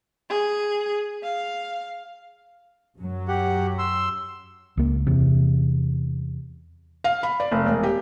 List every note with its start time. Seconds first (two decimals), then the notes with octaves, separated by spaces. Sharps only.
0.29 G#4
1.23 F5
2.96 F#2 F#3
3.28 G4 F#5
3.79 C6 E6
4.77 C#2 A#3
5.07 E2 C3
7.04 F5
7.23 B5
7.40 D5
7.52 F1
7.66 E1
7.83 G4